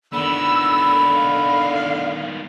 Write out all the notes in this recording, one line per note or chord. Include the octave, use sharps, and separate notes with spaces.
D3 D#3 B3 B5 E6
F5